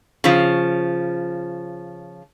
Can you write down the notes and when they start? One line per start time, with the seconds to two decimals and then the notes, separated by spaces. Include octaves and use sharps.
0.24 C#3 F3